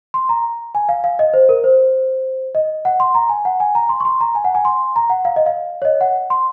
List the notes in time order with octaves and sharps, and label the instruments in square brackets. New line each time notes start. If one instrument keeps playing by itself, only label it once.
[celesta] C6
A#5
G#5
F5
F5
D#5
C5
A#4
C5
D#5
F#5
C6
A#5
G#5
F#5
G#5
A#5
C6
C#6
C6
A#5
G#5
F#5
G#5
C6
A#5
F#5
F5
D#5
F5
C#5
D#5
F#5
C6